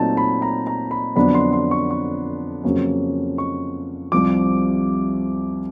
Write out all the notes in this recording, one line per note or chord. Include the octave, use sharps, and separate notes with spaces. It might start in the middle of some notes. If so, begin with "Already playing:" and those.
Already playing: A#2 F#3 A3 C4 D#4 A5
B5
A#5
A#5
B5
F2 D3 F#3 B3 D4 B5
C6
C6
C#6
C#6
F2 C#3 F#3 A#3 C#4
C#6
C2 C3 F3 D6